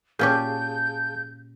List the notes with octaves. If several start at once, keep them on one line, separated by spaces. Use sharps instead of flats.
A#2 C#4 G4 G#4 F5 A5 G6